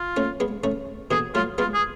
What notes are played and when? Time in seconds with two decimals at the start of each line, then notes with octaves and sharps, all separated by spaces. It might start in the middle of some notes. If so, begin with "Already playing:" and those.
Already playing: F4
0.17 A3 C#4
0.40 G#3 B3
0.64 A3 C#4
1.11 B2 D3 G#4
1.35 F#3 A3 F4
1.58 G#3 B3 F4
1.74 G#4